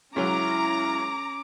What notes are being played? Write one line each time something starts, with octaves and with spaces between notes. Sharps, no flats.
C#2 F#3 C#4 E4 A#5 D6